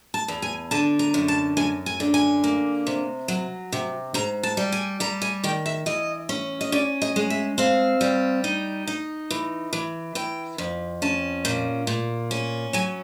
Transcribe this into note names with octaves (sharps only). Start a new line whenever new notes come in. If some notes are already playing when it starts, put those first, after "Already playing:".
A5
E2
G#5
D3 A5
A#5
F#2
A5
F#2 G#5
G#5
D3
G#5
A#3
C3
F#3
C3
G#2 A#5
A5
G3
G#5
G3 A#5
G#5
D#3 G5
E5
E3 D#5
C#4
D#5
C#4 D5
D#5
G#3
E5
C4 F5
G3
D#4
D#4
E3
E3
E3 G5
F2
C#4 A5
A#2
A#2
C#4
F#3 G#5